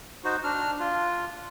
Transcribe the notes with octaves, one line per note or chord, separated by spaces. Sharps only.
D#4 F#4 C5
D4 F6
F4